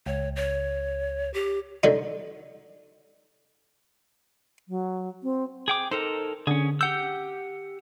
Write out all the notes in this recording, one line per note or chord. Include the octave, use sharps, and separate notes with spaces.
C#2 C#5
C#5
G4
D3 F#3 D#4
F#3
C4
G#4 G5 D6
D#4 A4 A#4 C5
D3 C#4 G#4
G4 F#5 E6 G6